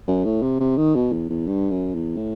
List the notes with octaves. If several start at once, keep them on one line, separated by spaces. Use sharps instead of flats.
F#2
A2
C3
C3
D#3
B2
E2
E2
G2
F#2
E2
A2